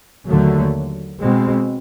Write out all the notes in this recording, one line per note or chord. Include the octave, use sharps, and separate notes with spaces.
D#2 D3 F#3 A3
B2 G#3 C4